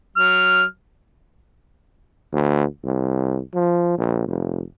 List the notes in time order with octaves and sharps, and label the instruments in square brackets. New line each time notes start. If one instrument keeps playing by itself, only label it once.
[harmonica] F#3 F6
[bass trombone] D2
C2
F3
A#1
F1